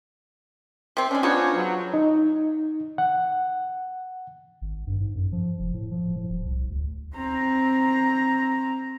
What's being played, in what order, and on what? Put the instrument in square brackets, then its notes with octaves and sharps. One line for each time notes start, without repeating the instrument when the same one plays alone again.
[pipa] C3 C4
[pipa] G#3 D4 [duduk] C#4
[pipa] B3 D4 F#4 [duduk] F4 [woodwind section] G#4 C5 C#5
[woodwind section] F#3
[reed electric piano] D#4
F#5
[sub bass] G#1
G2
G#2
F#2
F3
F1
A2
F3
A2
D#1
C2
D2
[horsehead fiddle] C4 A#5